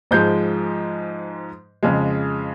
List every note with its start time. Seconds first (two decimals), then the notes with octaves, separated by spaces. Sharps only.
0.11 G#2 F3 G#3 G6
1.83 F2 C#3 F3 G#3